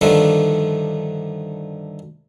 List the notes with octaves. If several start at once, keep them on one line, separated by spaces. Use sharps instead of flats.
G2 D3 D#3 F3 A3